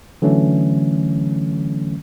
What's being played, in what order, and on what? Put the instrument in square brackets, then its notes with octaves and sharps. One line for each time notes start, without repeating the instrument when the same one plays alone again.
[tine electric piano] D3 E3 F#3 A3 C#4